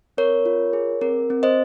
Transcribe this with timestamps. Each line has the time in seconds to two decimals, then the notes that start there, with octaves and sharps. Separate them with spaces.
0.17 C4 A#4 C#5
0.45 F4
0.73 G#4
1.01 C4 A#4
1.30 C4
1.43 C5 D#5